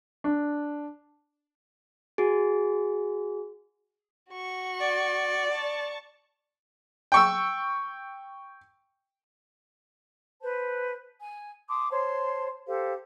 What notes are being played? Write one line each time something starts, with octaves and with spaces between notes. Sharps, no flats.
D4
F#4 G#4
F#4 C#6
D5
A5 C#6
G5 C#6 E6
B4 C5 A5
G#5
A5 C6 D6 D#6
C5 C#5 A5 C6
G4 A4 C5 F5